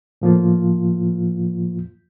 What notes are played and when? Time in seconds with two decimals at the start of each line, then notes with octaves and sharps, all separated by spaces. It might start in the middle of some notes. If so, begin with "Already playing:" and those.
0.22 A2 F3 A#3 F4